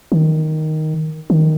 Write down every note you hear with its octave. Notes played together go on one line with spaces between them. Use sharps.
D#3
D#3